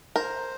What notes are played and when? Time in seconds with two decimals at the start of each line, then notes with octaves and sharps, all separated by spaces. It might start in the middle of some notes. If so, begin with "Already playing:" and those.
0.16 A#4 C5